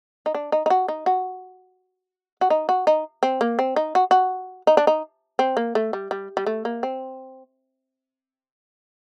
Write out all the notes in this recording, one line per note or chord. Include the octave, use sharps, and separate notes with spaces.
D#4
D4
D#4
D#4
F#4
D#4
F#4
F#4
D#4
F#4
D#4
C4
A#3
C4
D#4
F#4
F#4
D#4
D4
D#4
C4
A#3
A3
G3
G3
G3
A3
A#3
C4